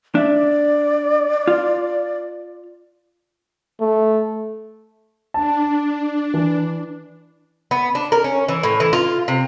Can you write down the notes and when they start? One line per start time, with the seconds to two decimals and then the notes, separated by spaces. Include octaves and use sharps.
0.15 D4 D5 E5
1.47 F4
3.81 A3
5.34 D4 A5
6.34 E3
7.71 B3
7.95 D4
8.12 A#4
8.24 C#4
8.49 E3
8.63 A2
8.80 E3
8.93 F4
9.28 C3